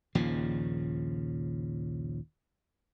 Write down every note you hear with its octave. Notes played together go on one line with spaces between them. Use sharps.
A#1 D#2 C#3 F3